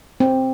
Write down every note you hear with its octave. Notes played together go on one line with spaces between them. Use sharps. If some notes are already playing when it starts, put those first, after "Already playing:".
C4